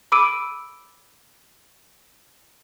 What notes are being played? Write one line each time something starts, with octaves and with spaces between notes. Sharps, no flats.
B5 D6 E6 D7 D#7